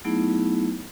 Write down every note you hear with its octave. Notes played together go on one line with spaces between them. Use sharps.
F#3 A3 B3 D#4 E4 G#4